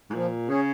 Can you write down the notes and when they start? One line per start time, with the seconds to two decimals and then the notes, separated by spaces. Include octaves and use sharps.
0.10 G#2
0.14 A#2 F3
0.49 C#3 C#4 G#4